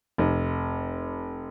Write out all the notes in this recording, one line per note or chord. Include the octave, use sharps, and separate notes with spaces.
F1